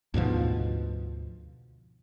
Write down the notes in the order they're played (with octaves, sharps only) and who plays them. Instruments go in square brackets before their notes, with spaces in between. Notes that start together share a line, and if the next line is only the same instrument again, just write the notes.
[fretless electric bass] D2 G#2 B2 F3